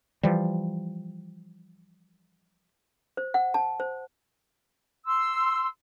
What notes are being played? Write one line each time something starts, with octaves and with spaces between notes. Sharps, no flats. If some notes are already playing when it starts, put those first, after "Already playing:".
E3 F3 G3
C5
F#5
A5
C5
C6 E6